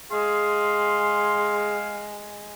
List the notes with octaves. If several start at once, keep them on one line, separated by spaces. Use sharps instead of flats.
G#3 G#4 F5 C6